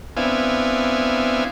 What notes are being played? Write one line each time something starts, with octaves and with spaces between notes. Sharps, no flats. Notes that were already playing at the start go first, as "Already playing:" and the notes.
B3 C4 D4 E4 F5 G#5